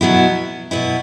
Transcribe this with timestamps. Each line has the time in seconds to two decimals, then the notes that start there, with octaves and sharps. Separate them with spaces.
0.01 B2 F#3 B3 E4
0.71 B2 F#3 B3 E4